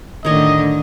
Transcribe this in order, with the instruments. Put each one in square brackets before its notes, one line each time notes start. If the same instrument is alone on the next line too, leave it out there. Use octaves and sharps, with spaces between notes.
[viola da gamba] A2 D3 [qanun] D#3 C#5 [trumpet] D#5